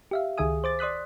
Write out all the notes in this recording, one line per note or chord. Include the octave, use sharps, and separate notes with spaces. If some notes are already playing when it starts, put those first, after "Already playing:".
G4 E5 F5
C#2 D#3 G#4 E5 G#5 D#6
C5 D6 A6
D5 C6 D#6 F#6 B6